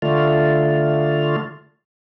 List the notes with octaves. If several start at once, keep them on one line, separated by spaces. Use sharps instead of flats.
D3 A3 F4